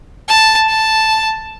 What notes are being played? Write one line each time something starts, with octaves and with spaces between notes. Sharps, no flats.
A5
A5